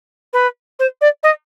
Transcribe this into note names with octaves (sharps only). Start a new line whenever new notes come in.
B4
C5
D5
D#5